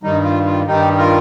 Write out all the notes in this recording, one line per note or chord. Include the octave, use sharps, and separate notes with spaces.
G2 D#3 G3 D#4
F4
F4
G2 D#3 G3 D#4 G4
F4 A#4